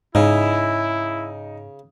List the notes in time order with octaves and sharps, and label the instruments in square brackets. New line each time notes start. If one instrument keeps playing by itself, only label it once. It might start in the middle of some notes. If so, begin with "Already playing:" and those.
[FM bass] G#2 [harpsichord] C#3 [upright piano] D#4 [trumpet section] E4